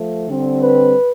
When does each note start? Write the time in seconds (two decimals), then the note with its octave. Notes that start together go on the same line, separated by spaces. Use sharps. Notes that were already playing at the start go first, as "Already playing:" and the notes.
Already playing: F3 A3
0.28 D3 G3 C4
0.62 B4